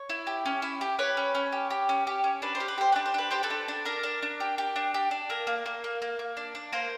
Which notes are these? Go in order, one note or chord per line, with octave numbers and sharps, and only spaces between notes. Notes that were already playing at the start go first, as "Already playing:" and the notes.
Already playing: C#5
E4
G4
C#4
E4
G4
G4 B4 C#5
C#4
C#4
G4
G4
C#4
G4
C#4
D4 B4
C5
G4
B4
G4 C5
D4 B4
C5
D4 B4
G4 C5
A4 B4
D4
D4
D4 A#4
D4
D4
G4
G4
D4
G4
D4
A#3 A#4
A#3
A#3
A#3
A#3
A#3
D4
D4
A#3 A#4 C5